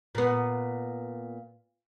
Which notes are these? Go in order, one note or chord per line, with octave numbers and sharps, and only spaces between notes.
A#2 B3